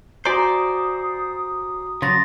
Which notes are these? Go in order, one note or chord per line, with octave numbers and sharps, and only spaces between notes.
F#4 C5 D5 G#5 A#5 D#6
C#3 F#3 C6 A6 A#6